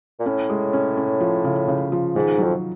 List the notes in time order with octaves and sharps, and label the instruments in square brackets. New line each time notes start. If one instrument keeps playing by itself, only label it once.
[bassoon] A#2
[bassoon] A2 [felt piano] C#4
[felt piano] G#3
C#4
C#4
F3
C#3
C#3
F3
[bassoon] G#2 [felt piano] D#3
[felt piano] F#3
[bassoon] F2